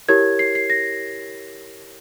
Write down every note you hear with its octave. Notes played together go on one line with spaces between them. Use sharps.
E4 G4 A#4 C#5 G#6
C7
C7
A#6